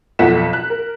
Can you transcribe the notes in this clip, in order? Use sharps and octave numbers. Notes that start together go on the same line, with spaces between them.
B1 F2 A4 F#5 B6 E7
F#6
A#4